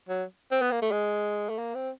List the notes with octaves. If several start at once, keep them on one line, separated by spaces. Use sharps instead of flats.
F#3
C4
B3
A#3
A3
G#3
A3
A#3
C4